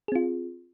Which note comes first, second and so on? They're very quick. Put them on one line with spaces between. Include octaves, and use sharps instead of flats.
G#4 C4 F4